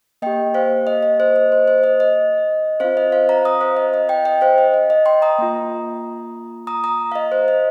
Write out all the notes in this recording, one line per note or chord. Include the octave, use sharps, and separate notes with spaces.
A#3 G4 D#5 G5
C5 F5
D#5
D#5
C5
D#5
C5
C5
D#5
D#5
C4 F4 C5 F5
D#5
C5 F5
F5 A#5
A#5 D#6
C5 F5
D#5
D#5
D#5 G5
D#5 G5
C5 F5
D#5
D#5
D#5
G5 C6
A#5 D#6
A#3 F4
A#5 D#6
A#5 D#6
F5
D#5
C5
D#5